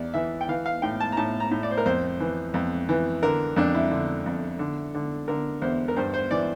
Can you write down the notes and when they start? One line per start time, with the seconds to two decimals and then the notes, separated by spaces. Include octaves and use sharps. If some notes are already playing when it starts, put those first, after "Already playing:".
Already playing: E2 D5
0.14 E3 E5
0.41 G5
0.49 E3 F5
0.66 F5
0.82 A2 G5
1.00 A5
1.12 A#5
1.17 A2 A5
1.40 A#5
1.51 A2
1.63 D5
1.71 C5
1.78 A#4
1.86 F2 C5
2.20 E3
2.54 F2
2.89 E3
3.23 D3 A#4
3.56 F2 D4
3.74 E4
3.91 D3
4.26 F2
4.59 D3
4.94 D3
5.28 D3 A#4
5.62 E2 C5
5.88 A#4
5.96 G2 C5
6.14 C5
6.31 E3 D5